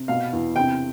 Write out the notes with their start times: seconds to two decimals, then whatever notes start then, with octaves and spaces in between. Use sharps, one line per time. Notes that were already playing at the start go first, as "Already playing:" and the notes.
Already playing: C3
0.08 B2 F5
0.33 E2
0.56 C3 G5